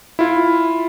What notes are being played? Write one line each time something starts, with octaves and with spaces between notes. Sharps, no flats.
E4 F4